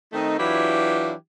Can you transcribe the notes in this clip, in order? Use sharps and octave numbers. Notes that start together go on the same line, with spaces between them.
D#3 A3 C4 D#4
E3 F#3 D4 E4 F4 G4